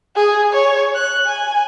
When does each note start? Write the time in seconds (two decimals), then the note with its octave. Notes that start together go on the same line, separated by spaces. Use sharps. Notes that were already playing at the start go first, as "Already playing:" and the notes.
0.16 G#4
0.53 C#5
0.95 F#6
1.27 G#5